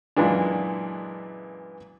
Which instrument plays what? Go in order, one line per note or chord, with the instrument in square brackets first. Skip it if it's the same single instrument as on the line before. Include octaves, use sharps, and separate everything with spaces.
[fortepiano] F#2 A#2 E3 G#3 D4